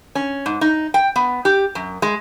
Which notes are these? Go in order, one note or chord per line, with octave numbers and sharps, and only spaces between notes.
C#4
G#2
D#4
G5
B3
G4
F#2
G#3